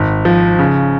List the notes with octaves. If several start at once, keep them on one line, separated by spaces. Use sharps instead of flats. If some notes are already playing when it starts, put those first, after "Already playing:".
Already playing: G#1
F3
C#3